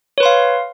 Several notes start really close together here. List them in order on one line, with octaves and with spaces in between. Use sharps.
C#5 B4 C6 F5